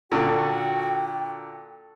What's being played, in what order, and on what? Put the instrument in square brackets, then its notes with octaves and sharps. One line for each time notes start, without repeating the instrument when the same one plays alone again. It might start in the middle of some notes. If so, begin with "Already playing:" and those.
[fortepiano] A#2 D3 [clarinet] F#4 [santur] A4 F#5 C#6 [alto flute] G5